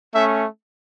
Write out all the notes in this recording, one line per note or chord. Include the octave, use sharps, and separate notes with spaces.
A3 C#4 E5